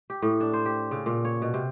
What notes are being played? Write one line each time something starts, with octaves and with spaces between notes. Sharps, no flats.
G4
A2
D4
C5
G4
C#3
A#2
C#5
B2
C3